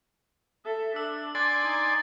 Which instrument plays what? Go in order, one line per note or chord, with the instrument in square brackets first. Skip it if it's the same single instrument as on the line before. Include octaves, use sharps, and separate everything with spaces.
[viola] A4 E5
[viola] D4 [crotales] E6
[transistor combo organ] D5 G#5 C6 [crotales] A6
[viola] D#4